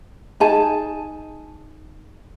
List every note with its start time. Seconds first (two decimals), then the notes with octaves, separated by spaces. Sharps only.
0.40 D#4 G#4 G#5 A5